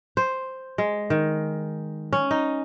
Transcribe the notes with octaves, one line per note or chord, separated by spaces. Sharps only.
C5
G#3
D#3
C#4
D#4